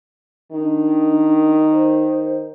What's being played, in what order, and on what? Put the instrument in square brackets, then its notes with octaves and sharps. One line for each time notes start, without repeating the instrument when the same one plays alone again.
[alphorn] D#3 [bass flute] D4
[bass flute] C5